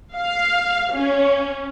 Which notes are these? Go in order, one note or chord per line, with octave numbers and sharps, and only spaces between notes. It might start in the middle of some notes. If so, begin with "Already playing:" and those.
F5
C#4